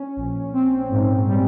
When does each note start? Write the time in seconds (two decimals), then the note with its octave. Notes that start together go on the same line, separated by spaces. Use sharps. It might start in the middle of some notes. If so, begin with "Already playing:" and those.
Already playing: C#4
0.16 A#1
0.53 C4
0.90 G#2
1.27 G3